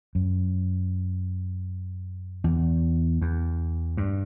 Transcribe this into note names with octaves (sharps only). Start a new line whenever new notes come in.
F#2
E2
E2
G2